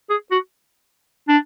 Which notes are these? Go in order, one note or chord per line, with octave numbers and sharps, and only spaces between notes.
G#4
F#4
D4